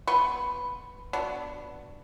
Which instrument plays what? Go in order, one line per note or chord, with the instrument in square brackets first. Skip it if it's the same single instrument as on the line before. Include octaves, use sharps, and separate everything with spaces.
[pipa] B3 B4 C6 C#6
B3 D4 F#4